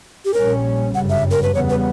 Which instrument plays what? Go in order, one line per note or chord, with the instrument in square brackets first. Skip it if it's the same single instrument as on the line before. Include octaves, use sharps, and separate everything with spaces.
[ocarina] G4
[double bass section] A#1 A#2 G3 C#4 [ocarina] A#4
[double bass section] G1 F#2 C#3 G3 [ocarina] F#5
[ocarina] E5
A#4
B4
[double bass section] E2 C#3 G3 B3 [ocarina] C#5
[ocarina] B4